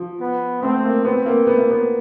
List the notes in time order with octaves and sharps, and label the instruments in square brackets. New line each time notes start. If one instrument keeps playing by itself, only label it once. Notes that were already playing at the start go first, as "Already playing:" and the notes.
Already playing: [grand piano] F3
[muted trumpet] B3
[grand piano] A3 [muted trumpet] C4
[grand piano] A#3
[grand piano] B3 [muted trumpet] C4
[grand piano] A#3
B3
A#3
B3